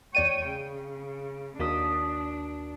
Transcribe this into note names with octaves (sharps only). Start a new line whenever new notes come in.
E2 C#5 D5 G5 D#7
C#3
D#2 D4 F#4 A#4 D#6 B6 E7